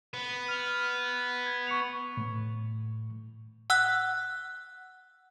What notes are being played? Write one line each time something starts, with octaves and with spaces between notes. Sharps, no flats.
B3
F6 F7
G#6
C#6 C#7 F7
A2
F#5 E6 F#6